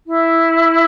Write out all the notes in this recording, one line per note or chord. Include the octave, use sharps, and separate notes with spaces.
E4